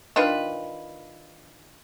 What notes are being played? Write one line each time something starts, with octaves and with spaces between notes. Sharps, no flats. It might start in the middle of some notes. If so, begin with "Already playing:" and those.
D#3 D4 F4 B4